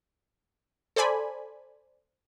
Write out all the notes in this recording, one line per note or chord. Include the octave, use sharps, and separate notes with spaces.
A4 C5 D5 G#5 B5